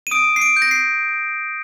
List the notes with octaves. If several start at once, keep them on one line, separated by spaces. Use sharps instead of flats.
D#7
D#6 D7
C7
D7
G6
A#6
C7